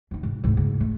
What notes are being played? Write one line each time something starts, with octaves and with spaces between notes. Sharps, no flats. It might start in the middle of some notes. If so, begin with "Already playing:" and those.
D2 D#4
G#2
D2 G#2
C#3 A#3
A3